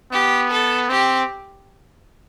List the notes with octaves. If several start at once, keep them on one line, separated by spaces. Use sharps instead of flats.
B3 G4
A4
C4 G4